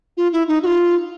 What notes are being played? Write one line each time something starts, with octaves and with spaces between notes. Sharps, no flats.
F4
E4
D#4
F#4
F4